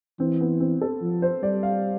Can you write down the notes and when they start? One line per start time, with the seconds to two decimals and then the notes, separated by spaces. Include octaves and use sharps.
0.20 E3 C4
0.41 B3
0.60 C4
0.81 A4
1.01 F3
1.22 C5
1.43 G3 D5
1.63 F5